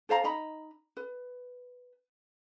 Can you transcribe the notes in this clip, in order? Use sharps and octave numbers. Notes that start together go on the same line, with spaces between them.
A4 C5 F5 A#5
D#4 D#5 A#5 B5
B4